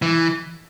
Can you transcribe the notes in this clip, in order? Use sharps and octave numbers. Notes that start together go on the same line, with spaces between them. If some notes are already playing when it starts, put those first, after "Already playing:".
E3